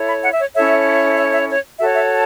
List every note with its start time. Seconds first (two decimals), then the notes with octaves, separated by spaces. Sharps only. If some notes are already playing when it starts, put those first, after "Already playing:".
Already playing: E4 A4 C#5
0.08 B5
0.24 F#5
0.33 E5
0.39 C#5
0.55 C#4 E4 A4 C#5 E5
1.17 E5
1.33 E5
1.49 C#5
1.79 F#4 A4 C#5 E5
1.95 E5
2.10 A5